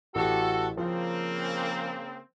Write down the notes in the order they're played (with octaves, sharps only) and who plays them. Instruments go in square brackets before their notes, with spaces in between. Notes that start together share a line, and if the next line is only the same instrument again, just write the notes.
[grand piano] A1 G4 [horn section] F#4 A4
[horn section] C#3 A#3 C4 [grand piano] F3